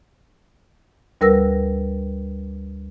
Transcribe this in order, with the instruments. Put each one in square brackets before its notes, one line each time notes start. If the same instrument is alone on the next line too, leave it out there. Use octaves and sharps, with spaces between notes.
[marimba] D2 G3 A#4 B4 E6 A#6